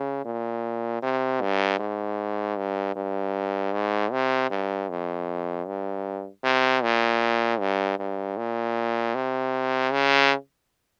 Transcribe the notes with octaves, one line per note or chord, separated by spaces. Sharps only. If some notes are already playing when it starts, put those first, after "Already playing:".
Already playing: C#3
A#2
C3
G2
G#2
G2
G2
G#2
C3
G2
F2
G2
C3
A#2
G2
G2
A#2
C3
C#3